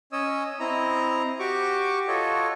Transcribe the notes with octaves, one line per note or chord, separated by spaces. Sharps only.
C#4 C#5 D#5 D#6 E6
C4 E4 D#5 A#5
F#4 G4 C#6 D6
F4 F#4 A4 C#5 D#5